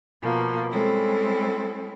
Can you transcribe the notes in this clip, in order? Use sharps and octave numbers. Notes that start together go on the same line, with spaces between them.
B2 F3 A#3
G3 G#3 C4 C#4 E4 A4